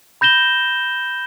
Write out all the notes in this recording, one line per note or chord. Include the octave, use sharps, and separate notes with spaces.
B5 G6 A#6 E7 G7